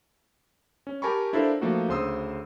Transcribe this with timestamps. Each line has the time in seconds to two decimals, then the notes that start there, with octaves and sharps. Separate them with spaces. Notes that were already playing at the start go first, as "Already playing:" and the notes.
0.87 C#4
1.02 G4 A#4 G#5 A5 B5 C#6
1.33 D4 E4 F4 A4 A#4 C5
1.61 F3 A3 A#3 D#4 F#4
1.88 D2 C#3 C5 C6 D#6 E6